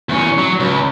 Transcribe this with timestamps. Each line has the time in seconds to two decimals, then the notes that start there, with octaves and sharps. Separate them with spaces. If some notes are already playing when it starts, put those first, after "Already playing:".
0.09 E2 C#4
0.38 F#3
0.60 C#2